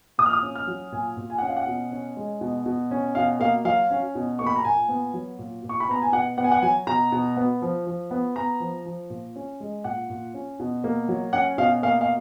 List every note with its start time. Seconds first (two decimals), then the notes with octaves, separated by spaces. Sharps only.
0.18 A#2 D#6
0.26 F6
0.33 D#6
0.42 C#4
0.55 F6
0.67 F#3
0.92 A#2 G#5
1.17 A#2
1.30 G#5
1.38 F#5
1.42 C#4
1.48 F5
1.57 F#5
1.66 B2
1.92 C#4
2.17 G#3
2.41 B2
2.66 B2
2.91 C#4
3.15 B2 F5
3.40 A#3 F5
3.65 F#3 F5
3.91 C#4
4.15 B2
4.39 A#3 C#6
4.47 B5
4.56 A#5
4.65 A#2 G#5
4.89 B3
5.14 F#3
5.39 A#2
5.64 A#2
5.69 C#6
5.80 B5
5.89 B3 A#5
6.02 G#5
6.12 B2 F#5
6.37 B3 F#5
6.44 G#5
6.51 F#5
6.62 F#3 G#5
6.87 B2 A#5
7.12 B2
7.37 B3
7.62 F3
7.87 F3
8.11 B3
8.36 B3 A#5
8.60 F3
8.86 F3
9.10 A#2
9.36 C#4
9.60 G#3
9.84 A#2 F#5
10.10 A#2
10.34 C#4
10.59 B2
10.84 A#3
11.08 F#3
11.33 C#4 F#5
11.58 B2 F5
11.83 A#3 F5
12.01 F5